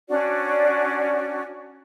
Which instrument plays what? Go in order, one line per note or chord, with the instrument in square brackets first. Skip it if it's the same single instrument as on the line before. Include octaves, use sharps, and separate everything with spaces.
[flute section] C#4 D4 F#4 D5